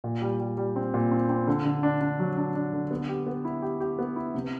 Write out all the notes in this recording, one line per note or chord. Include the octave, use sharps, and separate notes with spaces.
A#2
G3
G3
G3
C4
A#2
C4
C4
D3
D3
D4
D4
F#3
D4
D4
D3
B3
G4
B3
E4
G4
G4
B3
E4
C3